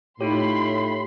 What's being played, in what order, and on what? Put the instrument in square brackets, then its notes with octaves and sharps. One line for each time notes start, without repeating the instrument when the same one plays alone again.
[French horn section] A2 [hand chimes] D#4 F4 C#5 [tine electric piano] G4 [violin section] B5 C6